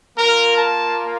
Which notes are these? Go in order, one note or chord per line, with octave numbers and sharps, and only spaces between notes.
A#3 F4 A#4
A5